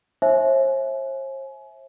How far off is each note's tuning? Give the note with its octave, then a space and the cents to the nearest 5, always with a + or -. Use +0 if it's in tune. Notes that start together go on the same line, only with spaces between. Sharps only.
C5 +45 E5 -5 G#5 +30